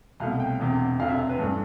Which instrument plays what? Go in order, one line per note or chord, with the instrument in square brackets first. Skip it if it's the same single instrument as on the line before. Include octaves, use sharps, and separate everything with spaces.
[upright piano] C2 B2 A3 F5
G5
E1 E2 C3
E1 D2 C3 F5
E5
F5
B4
G2 E3 A3 D4 A4